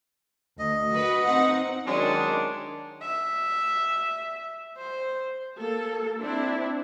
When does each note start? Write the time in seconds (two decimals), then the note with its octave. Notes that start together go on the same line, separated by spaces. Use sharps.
0.59 D2 D#5
0.93 F#4 B4
1.27 C4 D#4 F#5
1.87 D#3 F#3 G#3 C#4 D4
3.02 E5
4.78 C5
5.58 A#3 A4
6.21 C4 D4 E4